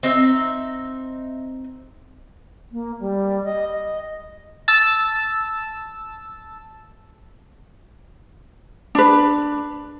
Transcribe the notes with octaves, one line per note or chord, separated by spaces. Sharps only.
C4 D#4 E5
A#3
G3
D#5
D#5
A5 E6
D4 B4